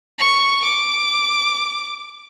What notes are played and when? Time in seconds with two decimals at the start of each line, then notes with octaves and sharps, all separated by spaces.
0.19 C#6
0.64 D6